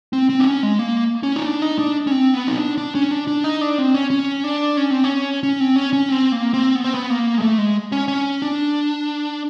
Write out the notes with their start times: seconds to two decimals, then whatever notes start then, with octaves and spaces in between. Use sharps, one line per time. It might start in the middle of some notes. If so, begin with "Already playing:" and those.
0.13 C4
0.29 C4
0.39 D4
0.46 C#4
0.63 G#3
0.79 A#3
1.23 C#4
1.36 D#4
1.46 D4
1.62 D#4
1.79 D4
2.07 C#4
2.11 C4
2.34 B3
2.47 D#4
2.57 D4
2.78 D4
2.95 C#4
3.11 D4
3.27 D4
3.44 D#4
3.61 D4
3.78 C4
3.94 C#4
4.10 C#4
4.44 D4
4.77 C#4
4.90 C4
5.04 C#4
5.43 C#4
5.60 C4
5.76 C#4
5.93 C#4
6.09 C4
6.32 A#3
6.54 C4
6.75 B3
6.84 C4
6.94 B3
7.10 A#3
7.38 G#3
7.42 A3
7.58 G#3
7.92 C#4
8.08 C#4
8.42 D4